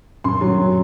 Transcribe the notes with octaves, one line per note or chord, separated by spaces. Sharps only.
F#2 C6
F#3
F#2